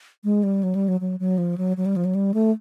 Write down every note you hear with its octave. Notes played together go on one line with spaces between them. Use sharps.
G#3
G3
F#3
G3
F#3
F#3
F#3
F3
F#3
F#3
G3
F3
F#3
G3
A3